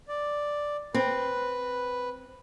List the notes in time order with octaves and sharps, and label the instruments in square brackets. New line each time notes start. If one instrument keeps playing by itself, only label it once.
[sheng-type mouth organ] D5
[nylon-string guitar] C4 [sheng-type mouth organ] B4